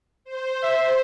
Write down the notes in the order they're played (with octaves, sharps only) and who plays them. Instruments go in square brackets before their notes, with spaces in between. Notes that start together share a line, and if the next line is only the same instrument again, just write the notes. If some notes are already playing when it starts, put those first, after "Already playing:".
[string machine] C5
[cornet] E5